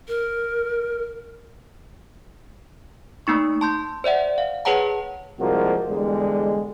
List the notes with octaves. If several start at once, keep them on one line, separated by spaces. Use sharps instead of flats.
A#4
A3 A#3 D#4 C#6
A5 C6 G6
C5 D5 E5 F#5
F5
G#4 B4 C#5 F#5 A5 A#5
C2 F3 G#3 A#3 F#4 A#4
E2 D3 G3 G#3